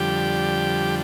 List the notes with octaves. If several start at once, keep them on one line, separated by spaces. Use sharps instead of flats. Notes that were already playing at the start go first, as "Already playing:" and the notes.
Already playing: F2 D3 G3 G4